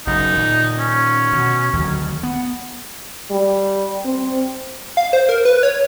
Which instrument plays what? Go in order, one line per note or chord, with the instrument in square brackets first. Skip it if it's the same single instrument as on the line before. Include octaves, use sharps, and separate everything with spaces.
[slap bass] F#1 F#2 [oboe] D#4
[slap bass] A#2 D#3
[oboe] C#4
[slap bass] B2
D2 D#3 F#3
B3
[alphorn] G3
C4
[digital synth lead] F5
C5
A#4
B4
C#5